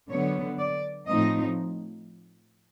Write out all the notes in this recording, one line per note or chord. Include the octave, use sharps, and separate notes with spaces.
D3 F#3 B3 C#5
D5
A2 F3 A3 C4 D#4 D#5